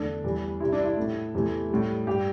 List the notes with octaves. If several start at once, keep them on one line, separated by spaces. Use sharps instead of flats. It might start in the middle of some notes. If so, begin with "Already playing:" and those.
Already playing: E2 D3 A3 D4
E2 E3 G3
C3 G3 E4
D4
E4
A2 A3
E2 C3 E3 A3
A2 G3
G2 G3 G4